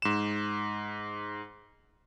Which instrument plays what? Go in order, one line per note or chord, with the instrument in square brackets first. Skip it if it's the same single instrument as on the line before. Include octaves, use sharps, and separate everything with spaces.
[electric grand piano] G#2 E7